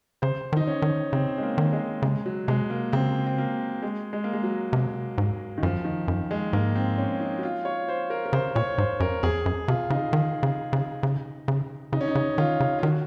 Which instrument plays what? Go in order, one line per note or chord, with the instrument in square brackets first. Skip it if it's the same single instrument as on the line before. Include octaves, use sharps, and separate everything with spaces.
[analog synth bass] C#3 [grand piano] C5
[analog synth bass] D#3
[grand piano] D#4
C#4
[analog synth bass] D#3
[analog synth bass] C#3 [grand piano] C4
[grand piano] G#3
A#3
[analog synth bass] D#3
[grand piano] G#3
[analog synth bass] C#3 [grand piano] G#3
[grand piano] F#3
[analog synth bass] C3 [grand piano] G#3
[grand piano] A#3
[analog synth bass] C#3 [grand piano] C4
[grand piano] C4
A#3
G#3
G#3
A#3
G#3
F#3
[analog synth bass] C3
G#2
[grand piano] D#3
[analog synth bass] F#2 [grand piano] F3
[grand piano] D#3
[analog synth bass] F#2
[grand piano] G#3
[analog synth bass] G#2 [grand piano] A#3
[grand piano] C4
C#4
D#4
F#4
F4
C#5
C5
A#4
A#4
[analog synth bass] C#3 [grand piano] C5
[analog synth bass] A#2 [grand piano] C#5
[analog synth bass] G#2 [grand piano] C5
[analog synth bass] F#2 [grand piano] A#4
[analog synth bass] F2 [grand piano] G#4
[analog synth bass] F#2
[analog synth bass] C3 [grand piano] F4
[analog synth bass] C#3 [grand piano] D#4
[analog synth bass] D#3
C#3
C#3
C#3
C#3
[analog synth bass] C#3 [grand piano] D#4
[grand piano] C#4
D#4
[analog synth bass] C#3
[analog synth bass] D#3 [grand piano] F4
[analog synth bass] C#3
[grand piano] F4
[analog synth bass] D#3 [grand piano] F#4